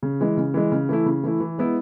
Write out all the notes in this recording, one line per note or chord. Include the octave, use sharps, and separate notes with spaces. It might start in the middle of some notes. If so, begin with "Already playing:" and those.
C#3
E3 G#3
C#3
E3 G#3
C#3
E3 A3 E4
C#3
E3 A3 E4
E3
G#3 B3 E4